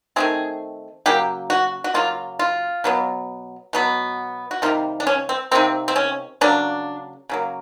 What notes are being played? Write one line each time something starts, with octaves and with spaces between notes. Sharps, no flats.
D#3 F#3 A3 C4 G#4
C#3 F#3 A#3 G4
F#4
F#4
C#3 F#3 A#3 F4
F4
B2 F#3 B3
B2 F#3 B3
F#4
C3 D#3 G3 A#3 F4
D4
C#4
C4
C3 D#3 G3 A#3 C4
C4
C#4
C#3 F#3 A#3 D4
C#3 F#3 A#3